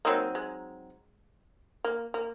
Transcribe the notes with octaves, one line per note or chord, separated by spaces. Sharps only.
F#3 A#3 C4 D#4
G#3
A#3
A#3